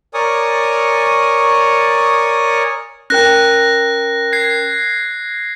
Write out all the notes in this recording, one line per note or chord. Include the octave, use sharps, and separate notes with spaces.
A#4 C#5 D5 G#5 C#6 D#6
C#4 A#4 G5 F#6 A#6
G#6 C7